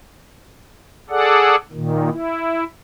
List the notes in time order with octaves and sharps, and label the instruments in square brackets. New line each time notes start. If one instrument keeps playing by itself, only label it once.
[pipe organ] G#4 A4 D5 F#5
A#2 D#3
E4